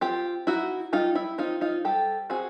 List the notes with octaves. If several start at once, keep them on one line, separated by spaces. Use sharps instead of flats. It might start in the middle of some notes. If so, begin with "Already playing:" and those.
C4 F4 G4
D#4 E4 F#4
G3 D#4 F4
E4
C4 D#4 F4
D#4 F4
G3 G4 A4
C4 F#4 G#4